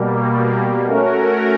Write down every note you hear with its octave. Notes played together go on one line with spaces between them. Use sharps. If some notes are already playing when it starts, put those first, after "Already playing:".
Already playing: B2 G3 A#3
A3 C#4 F#4 A#4